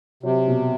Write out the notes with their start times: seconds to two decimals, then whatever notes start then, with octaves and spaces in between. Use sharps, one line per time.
0.23 C3 F#3
0.48 B2